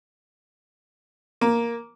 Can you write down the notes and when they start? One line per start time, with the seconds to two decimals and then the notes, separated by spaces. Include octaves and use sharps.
1.41 A#3